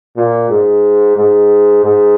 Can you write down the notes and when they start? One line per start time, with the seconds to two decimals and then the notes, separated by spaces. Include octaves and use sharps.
0.17 A#2
0.50 G#2
1.17 G#2
1.84 G#2